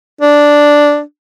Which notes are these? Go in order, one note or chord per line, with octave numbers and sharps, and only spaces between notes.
D4